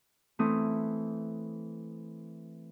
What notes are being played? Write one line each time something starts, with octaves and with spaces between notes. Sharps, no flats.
E3 A3 C4 D#6